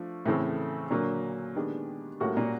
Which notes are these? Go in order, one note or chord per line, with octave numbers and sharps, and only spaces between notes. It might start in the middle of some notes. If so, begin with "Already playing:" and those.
Already playing: F3 A3 D4
A2 C#3 E3 A3 C4
A#2 D3 F#3 A#3
D#3 G#3 B3 D4 G4
A2 G3 A#3 C#4 F#4
A#2